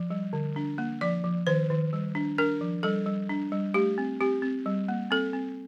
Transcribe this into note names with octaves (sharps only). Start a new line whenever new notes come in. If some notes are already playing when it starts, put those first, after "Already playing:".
Already playing: F3
G3
D3
D4
A#3
F3 D5
F3
D#3 C5
D#3
G3
D4
D4 A#4
F3
G3 A4
G3
D4
G3
A3 G4
C4
C4 G4
C4
G3
A#3
C4 A4
C4